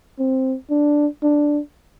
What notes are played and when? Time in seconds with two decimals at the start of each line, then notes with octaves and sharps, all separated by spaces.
0.19 C4
0.70 D4
1.23 D4